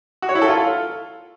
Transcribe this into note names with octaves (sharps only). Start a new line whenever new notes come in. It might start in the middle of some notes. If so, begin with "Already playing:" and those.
F#4
C#5
E4
A4
F4